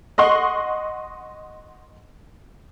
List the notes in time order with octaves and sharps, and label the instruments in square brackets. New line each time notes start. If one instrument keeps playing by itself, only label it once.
[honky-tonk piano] D#5 F#5 C6 C#6